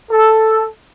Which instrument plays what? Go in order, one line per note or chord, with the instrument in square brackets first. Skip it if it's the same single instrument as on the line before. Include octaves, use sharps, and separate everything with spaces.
[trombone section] A4